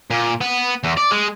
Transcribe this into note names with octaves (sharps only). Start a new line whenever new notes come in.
A#2
B3
E2
D5
G#3